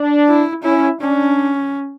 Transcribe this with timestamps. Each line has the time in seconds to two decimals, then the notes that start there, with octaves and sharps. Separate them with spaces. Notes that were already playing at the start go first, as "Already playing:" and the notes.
Already playing: D4
0.28 E4
0.64 C#4 E4
1.00 C#4 D4